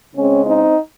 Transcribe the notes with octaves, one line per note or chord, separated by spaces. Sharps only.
C#3 G#3 C4 C#4
C4 D#4